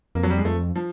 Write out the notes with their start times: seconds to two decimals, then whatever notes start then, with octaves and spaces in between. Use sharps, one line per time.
0.15 F2 A#3
0.23 F#3
0.30 G3
0.38 G#3
0.45 F2 A3
0.75 F3